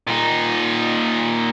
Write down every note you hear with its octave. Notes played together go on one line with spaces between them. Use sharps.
A#2 D#4